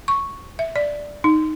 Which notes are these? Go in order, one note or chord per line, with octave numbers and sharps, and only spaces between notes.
C#6
E5
D5
D#4